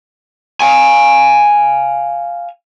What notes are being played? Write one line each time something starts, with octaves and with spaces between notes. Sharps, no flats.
F5 G#5